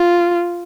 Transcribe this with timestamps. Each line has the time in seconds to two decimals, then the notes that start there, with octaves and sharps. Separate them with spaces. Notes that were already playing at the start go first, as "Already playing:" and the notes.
Already playing: F4